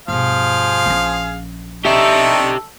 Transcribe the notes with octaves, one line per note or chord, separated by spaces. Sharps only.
G2 B2 F3 G#4 F5
A#1 C#4
D4 D#4 G4 A4 E5 C#6